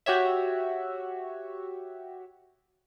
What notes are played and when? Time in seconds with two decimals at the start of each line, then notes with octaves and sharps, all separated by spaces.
0.06 F#4 G4 C#5 E5